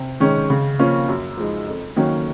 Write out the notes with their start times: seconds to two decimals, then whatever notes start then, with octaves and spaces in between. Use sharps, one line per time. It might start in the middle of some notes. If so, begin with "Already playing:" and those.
Already playing: C3
0.20 D#3 G#3 C#4
0.50 C#3
0.79 F3 A#3 C#4 F4
1.09 F#2
1.37 F3 G#3 D#4
1.67 F2
1.96 D#3 F#3 A#3 C#4